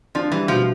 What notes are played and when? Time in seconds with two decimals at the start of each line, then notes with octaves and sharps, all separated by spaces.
0.15 F3 D4
0.32 E3 G3
0.48 B2 F3